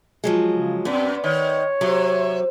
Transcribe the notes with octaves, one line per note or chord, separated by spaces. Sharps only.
F3 F#3 G#3
C#3
F#2 B3 C4 D5
D#3 C#5
C3 F#3